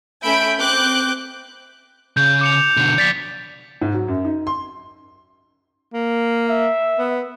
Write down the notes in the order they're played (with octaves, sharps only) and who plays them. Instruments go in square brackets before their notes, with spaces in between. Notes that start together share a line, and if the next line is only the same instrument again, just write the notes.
[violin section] A3 C#4 E5 B5 G6 D7
C4 D6 F#6 G6
[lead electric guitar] C#3 [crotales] G6
[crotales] D6 C#7 F7
[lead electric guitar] B2 D3
[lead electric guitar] F3 D5 [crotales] A6 B6
[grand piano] G#2
F#3
F#2
D#4
C6
[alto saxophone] A#3
[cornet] E5
[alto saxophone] B3